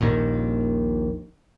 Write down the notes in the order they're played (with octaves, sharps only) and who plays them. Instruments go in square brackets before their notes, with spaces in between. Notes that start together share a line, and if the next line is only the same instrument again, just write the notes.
[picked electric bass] D#1 A#1 D#2 D#3